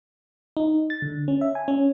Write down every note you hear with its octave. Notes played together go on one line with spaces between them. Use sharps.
D#4
A6
D3
C#4
E5
G#5
C#4